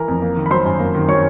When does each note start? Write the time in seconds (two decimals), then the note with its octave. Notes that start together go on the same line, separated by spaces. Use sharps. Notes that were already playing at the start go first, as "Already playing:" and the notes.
Already playing: E3 A#4 A#5
0.08 F2
0.22 A#3
0.36 D#3
0.46 B5
0.51 F#3 C5 C6
0.65 F#2
0.79 A#3
0.95 D#3
1.08 F#3 C#5 C#6